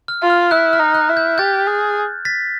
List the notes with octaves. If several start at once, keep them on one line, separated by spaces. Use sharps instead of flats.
F6
F4
F6
E4 F#6
F6
D#4
F#6
E4
G6
G4 G6 A6
G#4
A6 B6